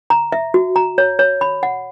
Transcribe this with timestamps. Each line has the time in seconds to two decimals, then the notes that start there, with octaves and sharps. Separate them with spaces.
0.10 A#5
0.32 E5
0.54 F#4
0.76 A#5
0.98 C#5
1.19 C#5
1.41 B5
1.63 F#5